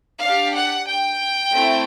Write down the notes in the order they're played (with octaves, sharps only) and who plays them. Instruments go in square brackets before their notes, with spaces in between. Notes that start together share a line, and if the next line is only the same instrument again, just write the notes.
[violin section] D4 G4 F5
F#5
G5
A3 C4 E4